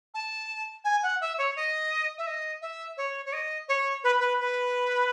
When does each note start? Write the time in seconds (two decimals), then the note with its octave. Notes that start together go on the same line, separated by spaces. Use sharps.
0.14 A5
0.84 G#5
1.03 F#5
1.21 E5
1.38 C#5
1.56 D#5
2.18 E5
2.27 D#5
2.62 E5
2.97 C#5
3.25 C#5
3.33 D#5
3.69 C#5
4.04 B4
4.20 B4
4.40 B4